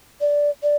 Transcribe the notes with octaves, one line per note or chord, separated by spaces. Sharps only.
D5
D5